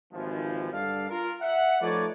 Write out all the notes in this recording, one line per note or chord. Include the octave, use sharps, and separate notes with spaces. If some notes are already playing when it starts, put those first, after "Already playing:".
G#1 D#2 E3 F3
G2 D3 A4 D5 F5
F4 A#4
E5 F#5
F3 A3 D#4 B4 C#5 D5